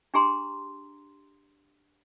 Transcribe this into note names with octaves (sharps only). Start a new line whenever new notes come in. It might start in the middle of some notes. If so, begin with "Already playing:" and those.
D4 G4 G#4 A#5 C6